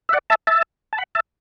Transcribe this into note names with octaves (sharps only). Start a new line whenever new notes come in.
E5
D5 F#5
E5 A5
E5 A5
A5
F#5 B5
E5 A5